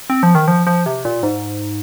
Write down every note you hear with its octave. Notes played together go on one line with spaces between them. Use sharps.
C4
F3
D#3
F3
F3
C3
A#2
G#2